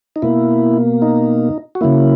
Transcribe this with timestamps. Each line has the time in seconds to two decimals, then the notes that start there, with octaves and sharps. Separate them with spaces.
0.16 D#4
0.22 B2 A#3 E4
1.02 D#4
1.75 F#4
1.81 C#3 F#3 A#3 E4